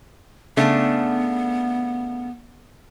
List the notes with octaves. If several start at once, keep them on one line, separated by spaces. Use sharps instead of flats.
C#3 A3 B3 D4